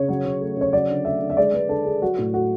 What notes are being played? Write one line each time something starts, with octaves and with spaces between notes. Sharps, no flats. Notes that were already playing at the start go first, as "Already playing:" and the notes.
Already playing: C#3 C#5
F#3
C#3
A3
C#3 C#5
F#3 D5
D3
A3 E5
D3
E5
G#3 D5
G#3 B4
D3 A4
D3 G#4
F#3 F#4
A2
A3 F#4